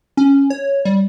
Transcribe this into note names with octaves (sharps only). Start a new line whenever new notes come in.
C#4
C#5
G3